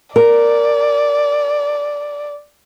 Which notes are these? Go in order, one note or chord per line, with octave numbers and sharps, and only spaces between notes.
A#4 D5